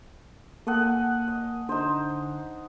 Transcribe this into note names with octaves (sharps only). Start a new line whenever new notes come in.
A#3 A4 D#5 F#5
G#5
D#5
D3 D#4 C5